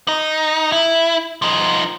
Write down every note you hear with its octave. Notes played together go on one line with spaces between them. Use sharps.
D#4
E4
F3 D#4